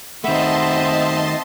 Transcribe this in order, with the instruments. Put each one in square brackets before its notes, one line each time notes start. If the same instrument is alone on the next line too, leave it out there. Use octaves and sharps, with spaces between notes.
[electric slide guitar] D#3 A3 [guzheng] B3 [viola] C4 E5 [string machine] D#5 A5 C6